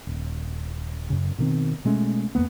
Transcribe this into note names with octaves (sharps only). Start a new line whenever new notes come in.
D#1
F#2 C#3
B2 D#3 C4
B2 G#3 A3 C#4
F2 G#2 A#3 B3